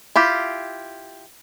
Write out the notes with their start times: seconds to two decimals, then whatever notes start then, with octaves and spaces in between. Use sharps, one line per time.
0.16 E4 F4 G4